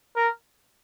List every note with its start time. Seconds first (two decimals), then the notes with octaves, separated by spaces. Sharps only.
0.16 A#4